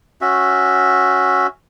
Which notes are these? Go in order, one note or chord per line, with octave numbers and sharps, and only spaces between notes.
C#4 F#4 E5